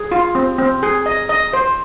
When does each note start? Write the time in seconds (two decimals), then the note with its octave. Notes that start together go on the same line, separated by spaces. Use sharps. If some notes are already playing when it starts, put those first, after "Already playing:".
Already playing: G#4
0.12 F4
0.35 C4
0.58 C4
0.83 G#4
1.06 D#5
1.29 D#5
1.53 C5